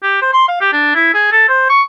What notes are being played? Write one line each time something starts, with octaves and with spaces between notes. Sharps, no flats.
G4
C5
C6
F5
G4
D4
E4
G#4
A4
C5
C#6